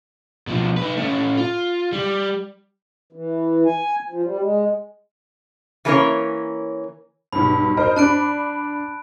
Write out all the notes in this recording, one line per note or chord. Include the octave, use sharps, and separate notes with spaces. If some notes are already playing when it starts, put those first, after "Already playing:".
B2 F3
D#4 B4
A3 C#4
F4
G3
E3
G#5
F3
G3
G#3
E3 A3 A#3 C#4 A#4 C#5
B1 G2 B5
A#4 C5 D#5
D4 A5 B5 F#6 D7